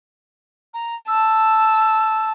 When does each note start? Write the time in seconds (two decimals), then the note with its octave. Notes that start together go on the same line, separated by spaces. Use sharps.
0.74 A#5
1.08 A5 E6